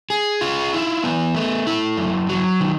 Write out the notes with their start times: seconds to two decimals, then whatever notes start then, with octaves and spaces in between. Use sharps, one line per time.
0.10 G#4
0.41 F4
0.73 E4
1.04 B3
1.35 A3
1.67 E4
1.97 F#2
2.29 F#3
2.60 D#3